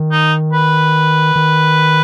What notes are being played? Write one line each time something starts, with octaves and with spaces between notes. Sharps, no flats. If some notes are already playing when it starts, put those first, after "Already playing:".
Already playing: D#3
D#4
B4
D#3